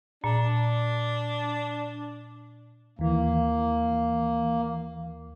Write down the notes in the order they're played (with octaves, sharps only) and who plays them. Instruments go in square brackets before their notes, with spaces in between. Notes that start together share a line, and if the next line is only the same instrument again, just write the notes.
[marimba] A#2 [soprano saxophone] D4
[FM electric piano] D#2 E3 [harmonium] A#3